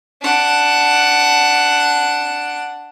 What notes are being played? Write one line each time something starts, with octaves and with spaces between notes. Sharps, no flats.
D4 F#5